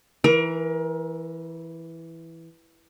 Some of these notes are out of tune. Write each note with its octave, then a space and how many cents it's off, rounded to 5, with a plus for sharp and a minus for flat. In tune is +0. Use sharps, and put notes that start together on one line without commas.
E3 +0 A#4 +30